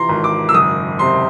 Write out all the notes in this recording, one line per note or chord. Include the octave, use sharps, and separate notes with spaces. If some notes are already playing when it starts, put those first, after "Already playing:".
Already playing: C3 E3 F3 A#5 C6
G#1
D6
E6
F#1 D#6
C3 C6